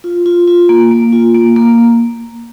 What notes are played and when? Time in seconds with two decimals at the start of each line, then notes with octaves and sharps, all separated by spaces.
0.04 F4
0.26 F4
0.48 F4
0.69 A#3
0.91 A#3
1.13 F4
1.35 A#3
1.56 A#3